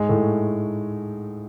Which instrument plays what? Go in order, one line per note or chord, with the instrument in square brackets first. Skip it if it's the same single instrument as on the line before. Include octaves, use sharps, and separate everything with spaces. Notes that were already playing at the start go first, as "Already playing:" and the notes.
Already playing: [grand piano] G#2 G#3
A2 A3